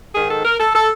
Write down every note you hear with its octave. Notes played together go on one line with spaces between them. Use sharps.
G#2 D#3 G#4
A4
A#4
A4
A4